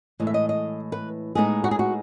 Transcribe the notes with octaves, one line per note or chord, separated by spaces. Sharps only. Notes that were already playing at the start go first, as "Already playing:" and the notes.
A2 E3 G#3 D#5
E5
D#5
D#5
B4
A2 G#3 B3 D#4 G#4
F#4
G#4
F#4